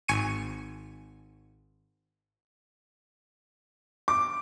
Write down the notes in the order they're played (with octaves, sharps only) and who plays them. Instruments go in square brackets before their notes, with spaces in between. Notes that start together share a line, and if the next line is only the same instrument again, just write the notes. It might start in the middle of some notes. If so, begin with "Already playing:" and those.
[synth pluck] G#1 G#5 C#6 C#7 D#7
[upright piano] D6